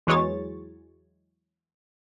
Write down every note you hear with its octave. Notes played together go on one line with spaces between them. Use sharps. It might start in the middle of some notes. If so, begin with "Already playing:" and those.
E2 E3 F#3 G#3 C#5 A6